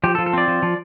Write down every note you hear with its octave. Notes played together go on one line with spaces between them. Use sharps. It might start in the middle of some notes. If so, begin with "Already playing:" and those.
F3 G4
A4
F3
A4
C4 D5
F3
F3